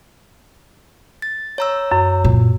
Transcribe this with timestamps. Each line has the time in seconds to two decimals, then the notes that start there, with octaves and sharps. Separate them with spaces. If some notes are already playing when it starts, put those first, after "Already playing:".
1.22 A6
1.58 C#5 A#5 E6
1.92 F#2
2.24 A#2